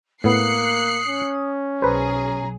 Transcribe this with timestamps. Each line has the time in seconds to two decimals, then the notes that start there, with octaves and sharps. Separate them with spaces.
0.24 A2 A#3 B3 D#6 F#6 C7 C#7
1.08 C#4
1.82 B1 F#3 G#4 B4 C5 A#5